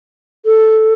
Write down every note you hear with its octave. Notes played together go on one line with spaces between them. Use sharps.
A4